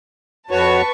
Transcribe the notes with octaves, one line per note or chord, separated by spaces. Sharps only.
F2 F#4 B4 C#5 A5 C#6